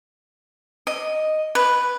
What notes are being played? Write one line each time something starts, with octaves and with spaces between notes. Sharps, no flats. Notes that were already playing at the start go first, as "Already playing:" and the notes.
D#5
B4